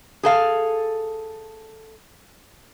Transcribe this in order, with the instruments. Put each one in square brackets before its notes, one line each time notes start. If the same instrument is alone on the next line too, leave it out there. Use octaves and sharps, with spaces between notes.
[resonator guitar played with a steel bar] G#4 A4 F5